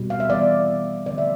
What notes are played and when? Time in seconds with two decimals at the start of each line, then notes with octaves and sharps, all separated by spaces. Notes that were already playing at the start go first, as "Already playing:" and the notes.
Already playing: B2 G3 C4
0.10 F5
0.20 E5
0.30 E3 G3 B3 D5
0.68 E3 G3 B3
1.06 D3 F3 A3 C4 D5
1.18 E5